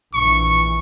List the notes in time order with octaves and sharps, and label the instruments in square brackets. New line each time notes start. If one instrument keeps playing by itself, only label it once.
[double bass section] A#1 E3 [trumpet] C#6